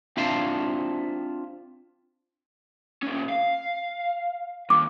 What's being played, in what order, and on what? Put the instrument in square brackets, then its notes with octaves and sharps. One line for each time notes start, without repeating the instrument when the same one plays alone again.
[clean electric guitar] C4 D4 F4 E5 F5 A5
[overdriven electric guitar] A#2 C#4
F5
[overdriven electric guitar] D#2 [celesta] D6